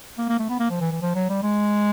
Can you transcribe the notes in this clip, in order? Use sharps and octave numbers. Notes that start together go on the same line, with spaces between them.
A#3
A#3
A3
B3
A#3
F3
E3
E3
F3
F#3
G3
G#3